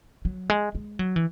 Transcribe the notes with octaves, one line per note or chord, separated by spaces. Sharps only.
F#3
G#3
G#3
F#3
E3